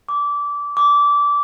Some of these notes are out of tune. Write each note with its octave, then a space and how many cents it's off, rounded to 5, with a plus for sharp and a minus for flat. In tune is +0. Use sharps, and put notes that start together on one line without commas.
D6 -20
D6 -20